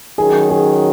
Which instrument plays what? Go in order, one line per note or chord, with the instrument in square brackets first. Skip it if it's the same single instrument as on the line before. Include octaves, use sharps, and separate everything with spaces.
[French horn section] D#3 F#3 C#4 F#4 [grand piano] G#4
[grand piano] G#4